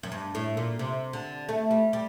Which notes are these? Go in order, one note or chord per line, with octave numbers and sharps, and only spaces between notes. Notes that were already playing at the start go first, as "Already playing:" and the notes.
F#2
G2
A2
A#2
C3
D3
A3
G3
G3